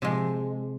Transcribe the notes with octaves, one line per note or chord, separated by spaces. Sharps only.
C3 F3 G#3